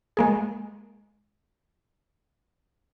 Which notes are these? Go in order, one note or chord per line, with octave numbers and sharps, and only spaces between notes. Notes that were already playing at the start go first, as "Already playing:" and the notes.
G#3 A#3 G#4